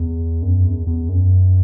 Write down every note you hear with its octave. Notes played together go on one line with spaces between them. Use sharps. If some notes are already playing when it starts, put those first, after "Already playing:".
Already playing: E2
F#2
E2
E2
F#2